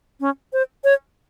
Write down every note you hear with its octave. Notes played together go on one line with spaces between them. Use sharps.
C#4
C5
C#5